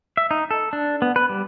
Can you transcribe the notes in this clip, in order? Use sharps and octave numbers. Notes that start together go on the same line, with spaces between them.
E5
D#4
A4
D4
B3
B4
G3